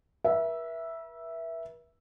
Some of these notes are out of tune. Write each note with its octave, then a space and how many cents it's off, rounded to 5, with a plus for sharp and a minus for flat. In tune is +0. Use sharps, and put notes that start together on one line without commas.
B4 -45 E5 +0